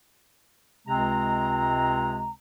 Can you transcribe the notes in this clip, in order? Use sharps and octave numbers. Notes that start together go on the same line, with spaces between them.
C#2 C3 G#3 C4 A#5